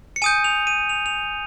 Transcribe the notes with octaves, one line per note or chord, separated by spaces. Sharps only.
C#7
G#5 D#6 G6 D#7
F7
D#7
F7
F7